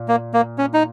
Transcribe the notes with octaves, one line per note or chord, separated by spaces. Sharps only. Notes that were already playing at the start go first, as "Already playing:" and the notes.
Already playing: A#2
A#3
A#3
C#4
D#4